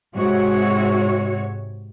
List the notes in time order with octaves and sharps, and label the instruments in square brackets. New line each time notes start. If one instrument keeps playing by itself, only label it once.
[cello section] G#2 C3 F#4 C#5